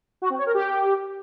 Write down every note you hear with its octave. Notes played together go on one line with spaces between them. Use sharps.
F#4
C4
C#5
A#4
G4